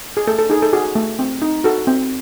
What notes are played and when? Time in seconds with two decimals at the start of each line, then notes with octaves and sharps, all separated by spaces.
0.17 G#4
0.27 A3 A4
0.39 A4
0.50 D#4 G#4
0.62 A4
0.73 F#4 G#4
0.95 A3
1.19 C4
1.42 D#4
1.64 F#4 A4
1.87 C4